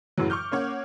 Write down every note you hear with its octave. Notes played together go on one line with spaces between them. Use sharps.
F#2 A2 C#3 E3 F#3
C#6 D6 F6 G6
A#3 C#4 C#5 F#5